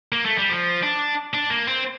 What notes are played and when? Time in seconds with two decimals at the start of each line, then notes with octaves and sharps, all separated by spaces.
0.12 A#3
0.25 A3
0.38 G3
0.50 F3
0.83 D4
1.34 D4
1.50 A#3
1.67 C4